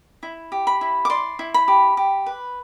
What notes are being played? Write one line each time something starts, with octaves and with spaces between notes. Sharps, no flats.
E4
G4
B5
E4
D6
D5 C6
E4
B5
G4
G4
B4